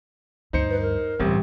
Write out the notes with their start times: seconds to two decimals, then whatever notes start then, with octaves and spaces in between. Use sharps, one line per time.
0.53 D2 G2 D#4 C5 C#7
0.70 B4
0.82 A#4
1.20 G1 C#2 A2 E3 G3 C4 G4